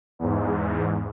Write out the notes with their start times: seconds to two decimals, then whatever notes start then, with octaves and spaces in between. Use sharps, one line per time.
0.19 E2 G#2